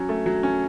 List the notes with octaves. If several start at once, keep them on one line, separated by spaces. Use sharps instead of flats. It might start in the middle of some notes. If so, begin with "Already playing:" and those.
Already playing: F#3 C#4
A3
F#3
C#4